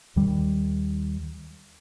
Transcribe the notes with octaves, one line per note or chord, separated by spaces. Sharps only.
D#2 D#3 G3